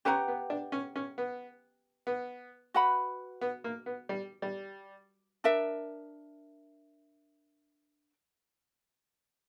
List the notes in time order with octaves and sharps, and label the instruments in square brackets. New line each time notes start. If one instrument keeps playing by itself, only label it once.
[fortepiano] C#4 [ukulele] G4 B4 F#5 A#5
[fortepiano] B3
D4
C#4
C#4
B3
B3
[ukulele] F#4 B4 F#5 B5
[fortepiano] B3
A#3
B3
G3
G3
[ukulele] D4 A#4 E5